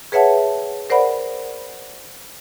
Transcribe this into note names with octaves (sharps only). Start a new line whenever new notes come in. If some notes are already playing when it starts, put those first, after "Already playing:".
G#4 B4 C#5 E5 F#5 A5
A#4 C5 D5 F#5 B5